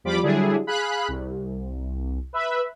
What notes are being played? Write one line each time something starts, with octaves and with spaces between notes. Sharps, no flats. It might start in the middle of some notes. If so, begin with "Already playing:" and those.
E2 F3 G3 F4 B5 D6
D3 F#3 G3 D4 E4 G#4
G#4 F5 B5 F#6
C2
B4 E5 B5